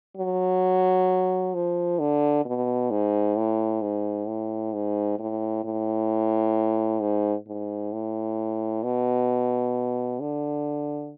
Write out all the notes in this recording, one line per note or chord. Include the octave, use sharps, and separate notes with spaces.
F#3
F3
D3
B2
G#2
A2
G#2
A2
G#2
A2
A2
G#2
G#2
A2
B2
D3